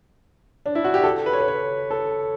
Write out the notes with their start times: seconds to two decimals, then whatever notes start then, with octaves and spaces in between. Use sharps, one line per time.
0.66 D4
0.75 E4
0.84 F#4
0.94 G4
1.04 A4
1.26 B4
1.33 C#5
1.41 B4
1.48 C#5
1.91 A4